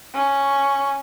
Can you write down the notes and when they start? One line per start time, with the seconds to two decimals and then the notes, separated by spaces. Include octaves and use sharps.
0.14 C#4 C#6